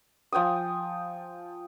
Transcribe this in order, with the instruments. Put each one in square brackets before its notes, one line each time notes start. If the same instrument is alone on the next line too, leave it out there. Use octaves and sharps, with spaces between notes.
[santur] F3 G5 G#5 D#6